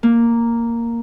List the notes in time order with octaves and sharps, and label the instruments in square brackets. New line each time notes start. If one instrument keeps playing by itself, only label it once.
[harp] A#3